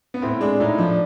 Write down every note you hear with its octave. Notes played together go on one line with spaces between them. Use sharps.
B3
A2 C4
G#3 D4
A2 D#4
F3 D4